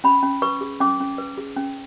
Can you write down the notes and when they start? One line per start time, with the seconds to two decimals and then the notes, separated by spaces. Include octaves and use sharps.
0.04 C#4 B5
0.23 C#4
0.42 B4 C#6
0.61 G#4
0.80 C#4 D6
1.00 C#4
1.18 B4
1.38 G#4
1.56 C#4